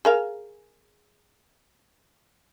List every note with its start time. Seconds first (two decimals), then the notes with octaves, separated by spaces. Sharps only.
0.05 G#4 A#4 F5